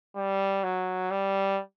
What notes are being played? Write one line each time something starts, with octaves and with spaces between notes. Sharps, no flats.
G3
F#3
G3